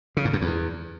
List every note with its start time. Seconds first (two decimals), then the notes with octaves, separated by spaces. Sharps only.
0.17 C#3
0.25 G#2
0.33 F#2
0.42 E2